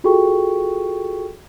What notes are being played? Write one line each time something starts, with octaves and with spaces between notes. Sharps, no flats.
F4 F#4 G#4 A4 G5 C#6